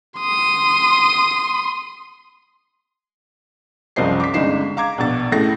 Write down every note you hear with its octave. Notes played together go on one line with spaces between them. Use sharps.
C6 D#6
F#1 C2 F3 C5 D#5 C7
D6 B6
G1 C#3 G#3 D#4 C7 E7
F5 A#5 D6 G#6
A#1 B2 A6
C#2 A2 A3 A#6